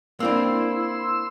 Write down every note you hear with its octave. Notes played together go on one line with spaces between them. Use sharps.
A#3 C4 D4 E4 C6 E6